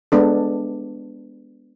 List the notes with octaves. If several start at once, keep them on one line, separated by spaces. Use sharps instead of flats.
G#3 B3 D4 A4